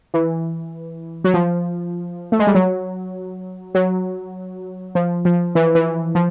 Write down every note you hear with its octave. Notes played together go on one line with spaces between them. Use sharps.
E3
F#3
F3
A3
G#3
G3
F#3
F#3
F3
F3
E3
E3
F3